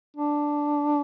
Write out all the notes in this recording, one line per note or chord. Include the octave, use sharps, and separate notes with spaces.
D4